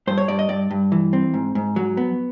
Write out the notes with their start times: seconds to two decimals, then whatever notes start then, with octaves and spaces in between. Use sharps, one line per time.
0.07 G2 C5
0.18 C#5
0.28 G2 D5
0.39 D#5
0.49 G2 D5
0.71 G2
0.92 E3
1.13 C4
1.34 G#2
1.55 G#2
1.76 F#3
1.97 B3